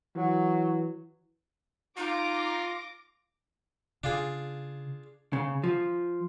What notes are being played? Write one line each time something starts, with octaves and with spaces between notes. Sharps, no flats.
E3 F#3
D#4 F4 D6 A#6
C#3 D4 F4 G#4
C#3
F3